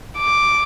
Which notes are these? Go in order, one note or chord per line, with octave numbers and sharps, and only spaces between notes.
D6